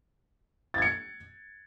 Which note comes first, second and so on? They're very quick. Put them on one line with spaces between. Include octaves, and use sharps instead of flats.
A6 G#6 C#7